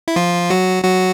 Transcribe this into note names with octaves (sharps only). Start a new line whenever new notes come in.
E4
F3 F4
F#3 F#4
F#3 F#4